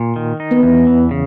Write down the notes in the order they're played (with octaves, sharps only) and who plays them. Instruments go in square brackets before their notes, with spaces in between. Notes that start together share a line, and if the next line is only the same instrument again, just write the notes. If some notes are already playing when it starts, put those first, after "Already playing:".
Already playing: [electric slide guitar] A#2
D#3
D#4
[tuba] B3
[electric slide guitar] E2
E3
C#3